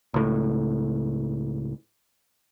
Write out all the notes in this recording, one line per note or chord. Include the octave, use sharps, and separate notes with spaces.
C#2 A2